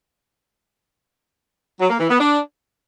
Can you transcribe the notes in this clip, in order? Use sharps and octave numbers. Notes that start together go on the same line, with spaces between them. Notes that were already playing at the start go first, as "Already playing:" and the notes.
F#3
A#3
E3
B3
D4